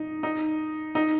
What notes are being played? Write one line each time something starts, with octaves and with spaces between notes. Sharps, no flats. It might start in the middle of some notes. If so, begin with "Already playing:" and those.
Already playing: D#4
D#4
D#4